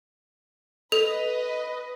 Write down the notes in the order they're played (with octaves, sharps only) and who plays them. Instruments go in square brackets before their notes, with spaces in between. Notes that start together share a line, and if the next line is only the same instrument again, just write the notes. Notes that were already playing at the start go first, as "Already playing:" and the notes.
[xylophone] A4 [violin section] B4 D#5